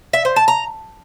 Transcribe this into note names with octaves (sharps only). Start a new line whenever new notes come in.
E5
C5
A5
A#5